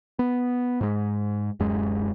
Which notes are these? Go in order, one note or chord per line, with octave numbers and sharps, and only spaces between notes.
B3
G#2 G#3
D1 F#2 G#3